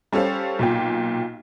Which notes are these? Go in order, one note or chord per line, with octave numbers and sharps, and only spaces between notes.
G3 C#4 A4 C5 F5
B1 A#2 G5